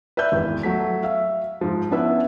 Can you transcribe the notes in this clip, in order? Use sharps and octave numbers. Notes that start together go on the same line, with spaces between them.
B4 D5 E5 G6
G#1 E2
F#3 A3 B6
E5 F5
G#2 F3
B3 C#4 D4 E4 B4 E5